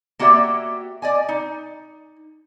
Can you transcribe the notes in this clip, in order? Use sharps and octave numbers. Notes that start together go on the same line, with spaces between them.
A#3 F#4 G4 C#5 D5 E5
D5 D#5 G#5
D#4